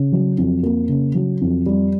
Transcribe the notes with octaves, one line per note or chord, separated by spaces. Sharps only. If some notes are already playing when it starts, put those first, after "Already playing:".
Already playing: C#3
F#3
F2
A#3
C#3
F#3
F2
G3